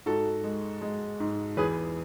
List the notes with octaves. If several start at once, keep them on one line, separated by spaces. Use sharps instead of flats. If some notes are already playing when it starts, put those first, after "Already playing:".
G#2 F#4 A4
G#3
G#3
G#2
E2 G#4 B4